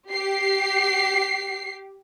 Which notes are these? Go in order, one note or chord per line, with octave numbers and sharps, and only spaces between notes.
G4 C7